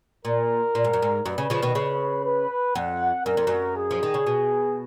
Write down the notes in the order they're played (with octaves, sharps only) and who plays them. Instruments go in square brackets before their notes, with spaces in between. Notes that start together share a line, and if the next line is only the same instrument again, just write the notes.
[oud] A#2 [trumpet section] A#4
[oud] A#2
G#2
F#2
G#2
[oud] F#2 [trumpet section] B4
[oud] C#3
C#3 F3
B2 D#3
C#3
[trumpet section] B4
[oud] F2 [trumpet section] F#5
[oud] F#2 [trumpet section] A#4
[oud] F2
F#2
[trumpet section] G#4
[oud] F3
D#3
C#3
B2